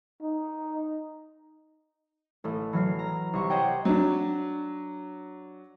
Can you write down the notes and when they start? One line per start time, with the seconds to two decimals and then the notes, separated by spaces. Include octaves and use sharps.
0.22 D#4
2.44 A1 A3
2.73 E3 F#3 F6 C7
2.99 A#5
3.33 C2 C#6
3.50 C5 C#5 D#5 F#5 G5
3.85 F#3 D4